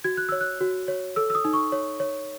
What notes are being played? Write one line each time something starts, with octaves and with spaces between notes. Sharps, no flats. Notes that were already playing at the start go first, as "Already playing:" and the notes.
F#4 G#6
F#6
C#5 E6
F#6
F#4
C#5
A4 E6
E6
D#6
D#4
C#6
C#5
C#5